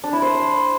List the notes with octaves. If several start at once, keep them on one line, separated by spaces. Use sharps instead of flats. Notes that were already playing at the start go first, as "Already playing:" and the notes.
D4
E4
C5